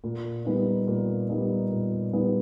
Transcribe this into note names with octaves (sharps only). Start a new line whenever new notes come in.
A#2
G3 B3 D#4
A#2
G3 B3 D#4
A#2
G3 B3 D#4